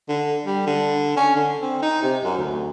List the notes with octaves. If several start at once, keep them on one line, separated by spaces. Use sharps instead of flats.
D3
G3
D3
C#4
D3
C4
D#4
C3
F#2
D2